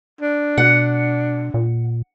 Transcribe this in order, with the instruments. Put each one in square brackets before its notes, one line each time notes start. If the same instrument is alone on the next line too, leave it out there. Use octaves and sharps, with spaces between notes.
[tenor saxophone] D4
[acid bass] B2 [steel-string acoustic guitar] F#5
[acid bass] A#2